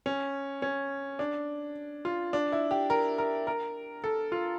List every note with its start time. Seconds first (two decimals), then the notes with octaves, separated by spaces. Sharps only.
0.06 C#4
0.62 C#4
1.19 D4
2.05 F4
2.33 D4
2.52 E4
2.71 G4
2.90 A#4
3.18 A#4
3.47 A#4
4.04 A4
4.32 F4